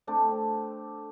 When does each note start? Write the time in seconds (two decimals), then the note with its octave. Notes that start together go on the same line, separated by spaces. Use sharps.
0.07 A3 C4 D4 A4
0.31 C4